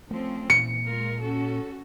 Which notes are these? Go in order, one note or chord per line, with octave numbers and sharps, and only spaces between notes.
F3 A3 C4 C#4
A#2 E3 C#7
G#3 F4 A#4
C#4 F#4 A4